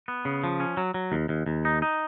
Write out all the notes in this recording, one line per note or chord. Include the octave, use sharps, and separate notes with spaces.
B3
C#3
F3
C#4
F#3
F#3
D#2
D#2
D#2
D#4
D#4